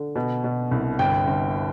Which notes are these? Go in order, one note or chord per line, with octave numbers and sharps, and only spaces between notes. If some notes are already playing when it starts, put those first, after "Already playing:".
Already playing: D3
B2
B2
C2
G1 G5
G1